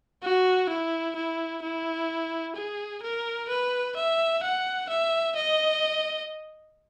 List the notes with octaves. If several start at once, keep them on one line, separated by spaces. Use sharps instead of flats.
F#4
E4
E4
E4
G#4
A#4
B4
E5
F#5
E5
D#5